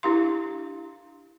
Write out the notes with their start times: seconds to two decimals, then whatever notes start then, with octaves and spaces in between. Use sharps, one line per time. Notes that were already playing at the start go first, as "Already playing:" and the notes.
0.03 D4 E4 G4 F5 C6